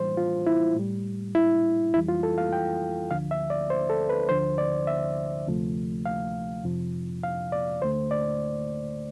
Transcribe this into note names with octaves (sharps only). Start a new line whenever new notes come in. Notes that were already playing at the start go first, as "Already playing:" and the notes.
Already playing: A2 E3 G3 C5
F4
E4
A2 G3
E4
F2 E3 G3 E4
F4
A4
F5
G5
D2 D3 F3 F5
E5
D5
C5
A4
B4
D2 D3 F3 C5
D5
E5
D2 C3 F3 A3
F5
F2 C3 F3
F5
D5
D2 D3 A3 C5
D5